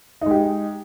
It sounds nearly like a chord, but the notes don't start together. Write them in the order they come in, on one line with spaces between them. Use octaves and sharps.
D#4 G#3 G4